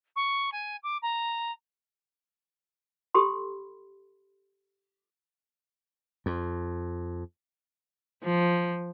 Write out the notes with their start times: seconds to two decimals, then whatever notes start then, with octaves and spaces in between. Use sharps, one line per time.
0.16 C#6
0.52 G#5
0.83 D6
1.02 A#5
3.14 G4 A4 B5 C6
6.26 F2
8.24 F3